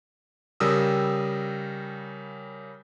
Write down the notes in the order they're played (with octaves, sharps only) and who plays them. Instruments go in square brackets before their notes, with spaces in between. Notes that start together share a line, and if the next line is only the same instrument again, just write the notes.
[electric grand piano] C#3 G3 A#4 D#6 E6